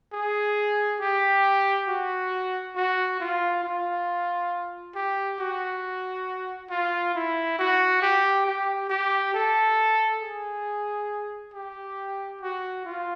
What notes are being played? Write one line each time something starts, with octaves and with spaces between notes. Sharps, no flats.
G#4
G4
F#4
F#4
F4
F4
G4
F#4
F4
E4
F#4
G4
G4
G4
A4
G#4
G4
F#4
F4